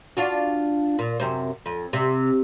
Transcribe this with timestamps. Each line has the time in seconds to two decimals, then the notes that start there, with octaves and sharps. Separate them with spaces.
0.17 D4 F4 F#4
0.99 A#2
1.20 F#2 C3 C5
1.66 F2
1.93 C3